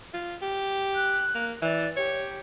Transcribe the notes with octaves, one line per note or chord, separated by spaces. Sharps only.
F4
G4
F#6
A#3
E3 D5
G4 C#5